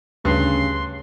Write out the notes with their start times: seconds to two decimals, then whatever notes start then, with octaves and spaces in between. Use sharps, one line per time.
0.25 D2 G2 C#3 C6